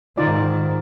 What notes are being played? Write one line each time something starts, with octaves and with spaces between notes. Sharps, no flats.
G#2 D#3 D#4 F4 D5